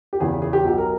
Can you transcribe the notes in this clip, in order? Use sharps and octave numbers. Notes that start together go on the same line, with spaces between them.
G4
E2 C#3 E3 G#4
G#4
G#4
G4
B1 B2 F#3
A#4